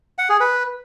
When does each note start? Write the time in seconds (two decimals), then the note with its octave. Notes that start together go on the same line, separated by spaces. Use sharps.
0.18 F#5
0.29 G#4
0.40 B4